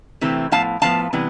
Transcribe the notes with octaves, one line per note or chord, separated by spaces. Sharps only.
C3 E3 A3 C4
A2 F3 B3 F5 A5
A2 F3 B3 F5 A5
C3 E3 G3 B3